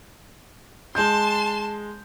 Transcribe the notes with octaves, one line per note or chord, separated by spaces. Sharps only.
G#3 A5 C6 G6